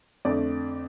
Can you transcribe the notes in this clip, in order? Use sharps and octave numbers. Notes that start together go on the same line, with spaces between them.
F2 D3 A3 D5